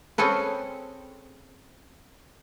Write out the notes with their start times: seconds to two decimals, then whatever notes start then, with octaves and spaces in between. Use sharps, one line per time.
0.18 C4 C#4 G#4 A4 B4